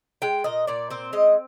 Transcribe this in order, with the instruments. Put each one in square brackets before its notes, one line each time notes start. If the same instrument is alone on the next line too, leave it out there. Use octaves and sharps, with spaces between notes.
[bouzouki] G#3 G5
A#2 D#5
A#2 D5
C4 C5
G#3 D#5